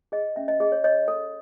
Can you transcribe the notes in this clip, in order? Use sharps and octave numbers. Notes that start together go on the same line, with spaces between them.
G#4 D#5
C#4 E5
D#5
G#4 D#5
C#5
C#5 D#5
A4